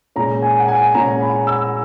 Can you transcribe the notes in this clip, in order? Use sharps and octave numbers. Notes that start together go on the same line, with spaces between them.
A#2 G#3 C#4 A#5
G#5
F#5
G#5
A#2 G#3 C#4 A#5
B5
E6